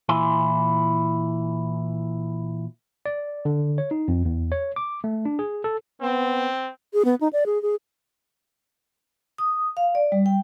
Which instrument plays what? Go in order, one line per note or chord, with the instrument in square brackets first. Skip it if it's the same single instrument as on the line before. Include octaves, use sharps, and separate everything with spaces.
[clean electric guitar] A#2 E3 E4 G#5 C6
[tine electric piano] D5
D3
C#5
D#4
F2
E2
C#5
D6
A3
D4
G#4
A4
[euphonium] B3 [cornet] C4
[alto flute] G#4
B3
D#4
D5
G#4
G#4
[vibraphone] D#6
F5
D5
G3
G5